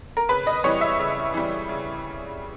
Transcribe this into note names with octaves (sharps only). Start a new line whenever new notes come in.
A#4
C#3 B4
D#5
E3 G3 C#5
E5
C#3
E3 G3
C#3